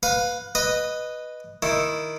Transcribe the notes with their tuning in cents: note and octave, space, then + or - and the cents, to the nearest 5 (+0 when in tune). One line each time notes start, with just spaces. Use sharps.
B4 +0 F5 +30
B4 +0 D#5 -5
D#3 +0 E4 +0